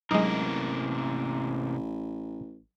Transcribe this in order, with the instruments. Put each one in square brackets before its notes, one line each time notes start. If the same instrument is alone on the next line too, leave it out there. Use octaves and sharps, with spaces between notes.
[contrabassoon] A1 [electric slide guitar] C3 A#3 A#4 [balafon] F#3 [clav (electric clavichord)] G#3 D#4